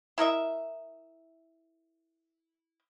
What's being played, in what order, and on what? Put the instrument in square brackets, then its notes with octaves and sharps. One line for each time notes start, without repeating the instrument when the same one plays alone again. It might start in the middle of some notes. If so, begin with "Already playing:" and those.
[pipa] E4 A#4 D#5 E5